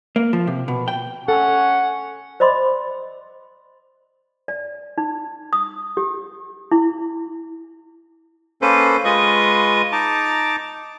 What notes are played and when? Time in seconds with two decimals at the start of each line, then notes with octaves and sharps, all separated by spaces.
0.16 A#3
0.33 F3
0.47 C3
0.68 B2
0.88 G5
1.28 C#4 A4 F#5
2.40 C5 D5 D#5 B5 C6 D6
4.48 D5
4.98 D#4
5.53 D#6
5.97 G4
6.71 E4
8.62 A#3 C#4 A4 B4 C5
9.05 G#3 F4 B4 D#5 C#6 D#6
9.92 D#4 A5 A#5 D6